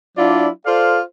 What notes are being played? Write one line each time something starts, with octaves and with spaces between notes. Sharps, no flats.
F#3 D4 E4 F4 D5
F4 A4 C5 D5 F5